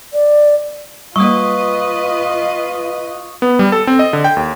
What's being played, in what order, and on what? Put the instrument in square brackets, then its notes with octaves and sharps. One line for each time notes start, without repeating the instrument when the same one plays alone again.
[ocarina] D5
[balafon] G3 A#3 [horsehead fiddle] F4 [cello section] B4 D#5 [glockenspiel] C#6 D#6
[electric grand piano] B3
G3
A4
C4
D#5
D3
G5
D#2